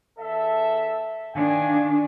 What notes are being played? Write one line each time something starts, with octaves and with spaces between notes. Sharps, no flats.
E2 A4 E5
D#3 D4 F5 G5 G#5